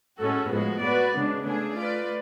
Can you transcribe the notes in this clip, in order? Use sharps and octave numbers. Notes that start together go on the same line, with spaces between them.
A2 G#3 C#4 F#4 A4
A2 F3 G#3 B3 F#4
B3 F#4 B4 D5
C#3 G#3 B3 D4
A3 D4 G#4
A3 F4 B4 D5